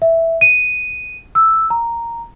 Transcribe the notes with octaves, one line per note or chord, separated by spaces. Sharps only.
E5
D#7
E6
A#5